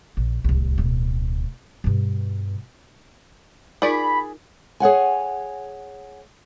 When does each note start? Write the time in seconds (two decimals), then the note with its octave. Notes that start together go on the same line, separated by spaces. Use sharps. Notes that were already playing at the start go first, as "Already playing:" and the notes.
0.17 A#1
0.44 D1 C2
0.78 D1 B2
1.84 G2 B2
3.82 D#4 F4 G#4 A#4 D5 B5
4.80 G#4 C#5 F#5 G#5